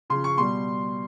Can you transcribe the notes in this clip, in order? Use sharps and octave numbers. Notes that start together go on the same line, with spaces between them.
C#3 F3 C6
C#6
B2 G3 C6